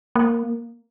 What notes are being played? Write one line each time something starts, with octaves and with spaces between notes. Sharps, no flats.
A#3